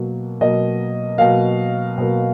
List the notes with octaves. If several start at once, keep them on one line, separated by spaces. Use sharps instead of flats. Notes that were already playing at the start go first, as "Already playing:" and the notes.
Already playing: B2 F#3 A#3
B2 F#3 A#3 D#5
B2 F#3 A#3 F5
B2 F#3 A#3